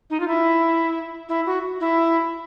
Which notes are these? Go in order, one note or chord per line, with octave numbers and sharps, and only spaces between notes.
D#4
F4
E4
E4
F#4
E4